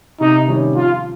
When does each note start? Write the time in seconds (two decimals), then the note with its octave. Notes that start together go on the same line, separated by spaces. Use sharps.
0.21 C3 D#4
0.48 D#3 G3 C#4
0.75 F3 F4